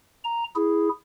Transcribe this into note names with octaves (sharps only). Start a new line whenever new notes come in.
A#5
E4 G#4